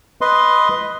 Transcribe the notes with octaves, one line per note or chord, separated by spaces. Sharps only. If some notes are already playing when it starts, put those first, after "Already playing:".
B4 D#5 C6